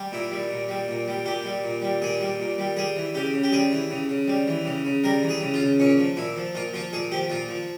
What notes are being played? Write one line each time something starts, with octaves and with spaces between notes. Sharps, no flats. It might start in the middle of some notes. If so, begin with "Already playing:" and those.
Already playing: G3
A#2 E4
G3
A#2
G3
A#2
G3
A#2 G4
G3
A#2
G3
A#2 G#4
G3
A#2
G3
G3 G#4
E3
C#3 G4
C#3
G4
G3 G#4
E3
C#3
C#3
G3
E3
C#3
C#3
G3 A#4
E3
G#4
C#3
F4
C#3
A#2 C#4
F3
A#2 E4
F3
A#2 F4
F3 F4
A#2 G#4
F3 G4
A#2 F4
F3